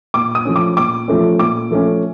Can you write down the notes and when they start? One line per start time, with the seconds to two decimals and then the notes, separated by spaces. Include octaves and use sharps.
0.14 A#2 D6
0.35 D#6
0.45 F3 A3 C#4
0.56 D6
0.77 A#2 D6
1.08 F3 A3 C#4
1.39 A#2 D6
1.71 F3 A3 C#4